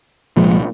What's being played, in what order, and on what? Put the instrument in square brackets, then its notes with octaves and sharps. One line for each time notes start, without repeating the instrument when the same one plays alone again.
[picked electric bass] C2 A#2 F3 G#3